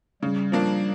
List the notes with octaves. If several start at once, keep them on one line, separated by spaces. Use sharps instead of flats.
C#3 G3
F3 A#3 D4